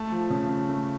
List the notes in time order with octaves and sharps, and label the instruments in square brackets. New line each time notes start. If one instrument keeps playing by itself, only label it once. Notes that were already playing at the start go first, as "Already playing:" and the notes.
Already playing: [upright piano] A3 A5
F3
C#3
C#3
A3